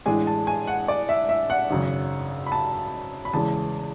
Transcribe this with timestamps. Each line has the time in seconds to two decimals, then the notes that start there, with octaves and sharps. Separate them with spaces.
0.06 A1 A2 G#3 D4 G#5
0.27 A5
0.47 G#5
0.67 F#5
0.88 D5
1.09 E5
1.29 E5
1.50 F#5
1.70 G#1 F#2 C#3
2.46 B5
2.52 A5
3.25 B5
3.33 E2 C#3 E3 G#3 A5